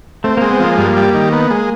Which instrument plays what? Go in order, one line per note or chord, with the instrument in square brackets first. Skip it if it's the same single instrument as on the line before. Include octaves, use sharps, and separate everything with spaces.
[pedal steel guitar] A3 [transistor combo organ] C4
[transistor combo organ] G#3 [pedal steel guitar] A#3
[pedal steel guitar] B3
[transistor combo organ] F3 [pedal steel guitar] A#3
[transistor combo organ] G2 [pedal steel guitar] A#3
[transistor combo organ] G3
D#3
B3
G#3